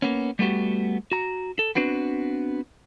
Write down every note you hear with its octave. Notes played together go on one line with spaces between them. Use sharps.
A#3 B3 C#4
G3 A3 B3 F#4 G4
F#4 A#5
A4
B3 C4 D4 F#4 B4